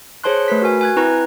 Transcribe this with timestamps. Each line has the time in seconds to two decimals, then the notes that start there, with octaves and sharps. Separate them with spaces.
0.24 G#4 C5 C#5 A5 C6 F#6
0.48 A3 B4 B6
0.62 F#4 A#4 G#5
0.81 G#5 F#6 G#6
0.96 C4 E4 B4 A#5 C#6 F#6